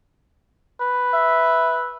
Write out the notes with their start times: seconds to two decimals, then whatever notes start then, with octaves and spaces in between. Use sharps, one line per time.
0.81 B4
1.13 E5